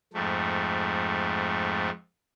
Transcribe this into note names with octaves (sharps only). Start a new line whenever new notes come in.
F2 G#2 A3